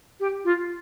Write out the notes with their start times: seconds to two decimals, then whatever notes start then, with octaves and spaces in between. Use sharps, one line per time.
0.20 G4
0.45 F4